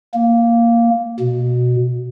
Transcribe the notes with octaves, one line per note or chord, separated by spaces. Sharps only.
A#3
B2